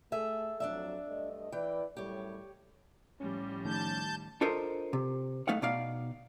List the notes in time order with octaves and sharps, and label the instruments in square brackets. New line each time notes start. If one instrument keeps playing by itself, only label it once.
[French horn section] A3 [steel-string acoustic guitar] G#4 A4 E5
[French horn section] F2 F#3 [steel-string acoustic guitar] D4 D5 E5
[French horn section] G2 A3 D#5
[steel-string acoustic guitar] E3 G5 [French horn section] E4 B4 D5
[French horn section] F#2 A2 G3 [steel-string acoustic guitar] G4 C#5
[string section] A2 F3 G3 [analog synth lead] C#4
[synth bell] D#3 A3 D#4 [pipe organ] A5 G6
[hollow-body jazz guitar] D4 F4 A4 A#4 C5 D#5
C3
A3 D#4 F5 F#5
B2 D#4 D5 F5